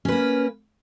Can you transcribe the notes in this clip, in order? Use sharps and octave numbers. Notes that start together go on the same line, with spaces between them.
A#3 C#4 B4